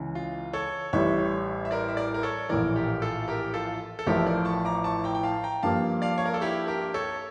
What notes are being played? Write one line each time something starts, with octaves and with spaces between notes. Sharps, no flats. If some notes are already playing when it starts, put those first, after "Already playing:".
Already playing: C#2 C#3 E3
F4
A4 C#5
A1 A2 G3 C#5 E5
E5
A#4 D5
E5
A#4 D5
A#4
A4 C#5
A#1 A2 E3 A#4 D5
G4 A#4
F4 A4
G4 A#4
F4 A4
A4
A1 A2 F3 A3 G4 A#4
A#4 D5
A5 C#6
A#5 D6
A5 C#6
G5 A#5
G5
F5 A5
G5 A#5
G2 F3 A#3 F5 A5
D5 F5
C#5
A#4
A4
E4 G4
G4 A#4
A4 C#5